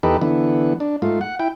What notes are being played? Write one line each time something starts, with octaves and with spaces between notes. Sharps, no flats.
E2 D#4 G4 A4 B4
D3 E3 B3
D4
G#2 A3 F4
F#5
E4 G5